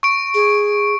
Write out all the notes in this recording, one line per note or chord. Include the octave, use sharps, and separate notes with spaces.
C#6 D7
G#4